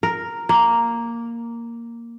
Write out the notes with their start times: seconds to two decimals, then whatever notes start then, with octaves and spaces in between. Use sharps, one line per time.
0.03 A#4
0.49 A#3